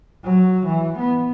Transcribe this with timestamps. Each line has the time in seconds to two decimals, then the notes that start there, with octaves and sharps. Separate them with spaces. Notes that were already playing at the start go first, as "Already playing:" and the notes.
0.25 F#3
0.67 E3
0.99 B3